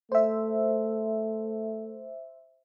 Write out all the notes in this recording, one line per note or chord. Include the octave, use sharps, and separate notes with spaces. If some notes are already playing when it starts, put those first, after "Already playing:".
A3 C5 E5